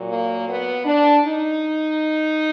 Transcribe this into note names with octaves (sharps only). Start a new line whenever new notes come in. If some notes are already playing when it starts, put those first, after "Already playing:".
Already playing: A#2 F#3
A#3
B3
D4
D#4